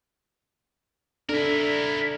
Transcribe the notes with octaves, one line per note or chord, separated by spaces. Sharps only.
D4 E4 A4 A#4